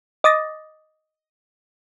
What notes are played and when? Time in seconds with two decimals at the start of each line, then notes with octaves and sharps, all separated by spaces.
0.24 D#5 D6 D#6 A6 A#6